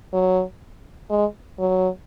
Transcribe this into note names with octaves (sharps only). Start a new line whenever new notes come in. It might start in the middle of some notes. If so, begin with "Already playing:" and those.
F#3
G#3
F#3